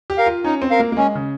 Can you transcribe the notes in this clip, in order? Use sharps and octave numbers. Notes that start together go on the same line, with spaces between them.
G4
A#4 F5
F4
C#4 D#4
C4
A#4 F5
A#3
A#3
G#3 C#4
C#3